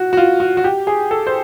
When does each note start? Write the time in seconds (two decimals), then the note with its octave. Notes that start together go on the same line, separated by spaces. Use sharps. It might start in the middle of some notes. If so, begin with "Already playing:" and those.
Already playing: F#4
0.13 F#4
0.17 F4
0.40 F#4
0.57 F#4
0.64 G4
0.87 G#4
1.11 A4
1.27 C5